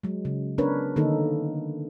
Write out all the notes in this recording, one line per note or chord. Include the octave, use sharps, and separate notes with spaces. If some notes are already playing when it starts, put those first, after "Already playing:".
F#3 G#3
C#3
B3 C#4 D4 A#4 B4 C#5
D3 D#3 A#3 D#4 A4